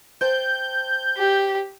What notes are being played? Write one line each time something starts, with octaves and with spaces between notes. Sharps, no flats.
C5 G5 A5 G6
G4